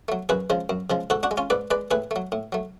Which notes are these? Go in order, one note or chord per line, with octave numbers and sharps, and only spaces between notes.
F#3 A3
F#2 G#4 B4
C#3 F3 G#3
F#2
C#3 F3 G#3
G#2 F#4 A4
D4 F#4
G#3
C#4 F4
G#2 B4 D5
G#3 B4 D5
A2 G#4 B4
F#3 A3
A2
F#3 A3